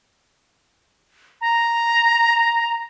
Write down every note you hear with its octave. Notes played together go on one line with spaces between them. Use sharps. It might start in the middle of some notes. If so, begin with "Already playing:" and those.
A#5